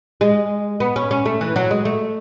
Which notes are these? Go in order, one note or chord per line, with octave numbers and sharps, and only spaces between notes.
G#3
B3
C#4
C#4
A3
E3
F#3
G#3
A3